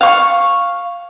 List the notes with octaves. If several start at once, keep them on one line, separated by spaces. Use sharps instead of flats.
F5 C#6